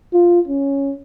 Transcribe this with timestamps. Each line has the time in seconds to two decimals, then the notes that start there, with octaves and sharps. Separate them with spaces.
0.14 F4
0.48 C#4